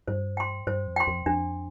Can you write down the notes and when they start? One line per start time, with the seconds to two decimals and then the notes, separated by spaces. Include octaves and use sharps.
0.08 G2 C5
0.37 G5 C6
0.67 G2 C5
0.87 F2
0.96 G5 C6
1.07 F2
1.26 F2 D4